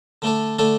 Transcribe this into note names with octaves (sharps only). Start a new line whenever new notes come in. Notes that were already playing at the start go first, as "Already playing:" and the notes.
D3 A3 D4 A4
D3 A3 D4 A4